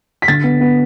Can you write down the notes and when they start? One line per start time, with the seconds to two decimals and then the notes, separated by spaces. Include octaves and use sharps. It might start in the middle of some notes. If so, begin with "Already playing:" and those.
0.22 B6
0.28 D3 A6
0.44 B3
0.61 B3